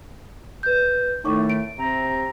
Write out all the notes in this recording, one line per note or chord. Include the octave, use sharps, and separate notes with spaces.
B4 G6
A2 D#3 A3 D#4 C#6 D6
D7
C3 C4 A#5